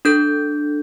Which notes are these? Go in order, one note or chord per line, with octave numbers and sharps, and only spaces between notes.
D4 A4 G6